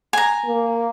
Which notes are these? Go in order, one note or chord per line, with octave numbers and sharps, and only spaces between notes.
G#5 A#5
A#3